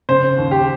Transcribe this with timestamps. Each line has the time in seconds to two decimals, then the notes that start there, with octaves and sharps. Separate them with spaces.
0.09 C#3 C5
0.38 D#2
0.51 G4